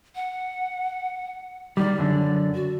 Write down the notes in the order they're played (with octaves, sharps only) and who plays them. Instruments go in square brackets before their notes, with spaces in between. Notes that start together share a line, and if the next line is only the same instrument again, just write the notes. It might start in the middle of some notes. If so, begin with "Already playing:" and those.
[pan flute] F#5
[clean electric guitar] D#3 G3 [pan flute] D5
[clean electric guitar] F#2 D3
[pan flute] F#4